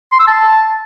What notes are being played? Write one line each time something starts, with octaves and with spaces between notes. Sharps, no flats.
C6
E6
A5